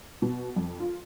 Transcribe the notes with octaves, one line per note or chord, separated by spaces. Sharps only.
B2
F2
F4